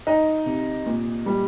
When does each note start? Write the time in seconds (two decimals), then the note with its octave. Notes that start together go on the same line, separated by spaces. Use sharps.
0.07 D#4
0.46 C3
0.86 A#2
1.26 G3